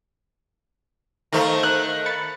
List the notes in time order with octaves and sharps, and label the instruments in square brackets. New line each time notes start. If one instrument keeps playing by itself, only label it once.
[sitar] D#3 A3 [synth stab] C5 F5 A#5
[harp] F#6
[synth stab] B5 A6 C#7